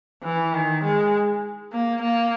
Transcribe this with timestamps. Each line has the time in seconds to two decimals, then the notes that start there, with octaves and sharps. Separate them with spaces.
0.24 E3
0.54 D#3
0.84 G#3
1.72 A#3
2.02 A#3